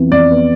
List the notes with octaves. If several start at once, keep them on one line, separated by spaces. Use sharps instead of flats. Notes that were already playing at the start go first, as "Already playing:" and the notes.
Already playing: F2 E3 B3
F2 D5
B3